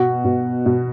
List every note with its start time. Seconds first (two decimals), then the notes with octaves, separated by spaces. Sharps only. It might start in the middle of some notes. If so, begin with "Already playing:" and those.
Already playing: B2 F#4
0.25 B2
0.66 B2